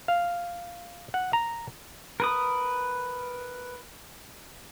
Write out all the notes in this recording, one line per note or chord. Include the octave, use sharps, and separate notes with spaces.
F5
F#5
A#5
A#4 B4 D#6